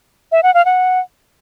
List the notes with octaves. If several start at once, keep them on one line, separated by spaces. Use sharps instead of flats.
E5
F#5
F5
F#5